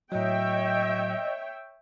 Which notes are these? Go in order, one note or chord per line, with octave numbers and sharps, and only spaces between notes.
A2 F#3 C#5 D#5 E5 G5